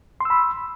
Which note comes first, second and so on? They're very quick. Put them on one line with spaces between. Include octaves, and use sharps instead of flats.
C6 E6 B5